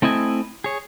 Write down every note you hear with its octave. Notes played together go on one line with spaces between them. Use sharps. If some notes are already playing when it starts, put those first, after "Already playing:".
A3 C4 E4 D#5 G#5
G#4 C#5